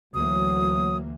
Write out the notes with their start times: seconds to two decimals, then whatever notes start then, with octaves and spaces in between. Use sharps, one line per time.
0.14 D2 E3 F#3 A#3 D#6